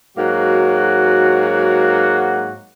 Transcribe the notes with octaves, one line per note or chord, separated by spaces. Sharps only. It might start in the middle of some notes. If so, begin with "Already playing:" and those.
G#2 F#3 A#3 F#4